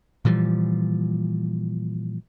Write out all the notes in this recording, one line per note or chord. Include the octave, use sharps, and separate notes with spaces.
A#2 E3 F3 G3